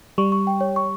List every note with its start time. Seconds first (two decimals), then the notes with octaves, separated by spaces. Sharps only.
0.18 G3 C#6
0.32 C#6
0.47 G5
0.61 C#5
0.76 C#6